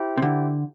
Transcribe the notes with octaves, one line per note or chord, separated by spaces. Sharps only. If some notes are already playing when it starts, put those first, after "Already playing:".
Already playing: E4 G4 C5 E5 G5
C3
D3